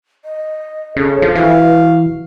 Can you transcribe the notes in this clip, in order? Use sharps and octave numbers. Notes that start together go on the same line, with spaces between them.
D#5
C#3 A4
F3
E3 F#4 F5